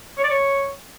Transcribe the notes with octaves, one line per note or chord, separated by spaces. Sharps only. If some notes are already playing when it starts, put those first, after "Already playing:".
C#5
D5
C#5